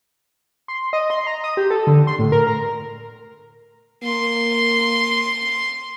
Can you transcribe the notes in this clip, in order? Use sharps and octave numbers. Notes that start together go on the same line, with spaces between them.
C6
D#5
C6
A#5
D#6
G4
A4
D3
C6
A2
A#4
A#5
A#3 C6